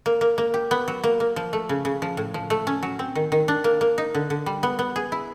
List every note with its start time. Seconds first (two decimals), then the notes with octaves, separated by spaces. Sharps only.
0.06 A#3
0.21 A#3
0.38 A#3
0.54 G4
0.71 B3
0.88 F#3
1.04 A#3
1.20 A#3
1.36 F3
1.53 A3
1.69 C#3
1.85 C#3
2.02 F3
2.17 A2
2.34 F3
2.50 A3
2.67 C#4
2.83 F#3
2.99 C4
3.15 D#3
3.32 D#3
3.48 D4
3.64 A#3
3.81 A#3
3.98 D#4
4.14 D3
4.30 D3
4.46 G3
4.63 B3
4.79 B3
4.96 G#4
5.12 E4